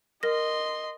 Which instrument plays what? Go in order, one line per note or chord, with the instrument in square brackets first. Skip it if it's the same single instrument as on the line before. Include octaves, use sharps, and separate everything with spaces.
[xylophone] A#4 A#6 [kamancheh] D#5 C6